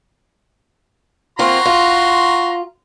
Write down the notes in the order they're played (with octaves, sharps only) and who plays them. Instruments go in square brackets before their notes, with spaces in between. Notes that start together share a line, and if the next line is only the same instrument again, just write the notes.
[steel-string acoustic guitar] A#3 C4 F4 [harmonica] F#4 A#5 C6
[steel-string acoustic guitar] F4